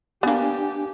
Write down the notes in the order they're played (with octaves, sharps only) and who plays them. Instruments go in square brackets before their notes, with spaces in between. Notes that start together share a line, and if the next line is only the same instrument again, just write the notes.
[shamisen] A#3 B3 [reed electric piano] D4 G#5 [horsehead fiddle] G4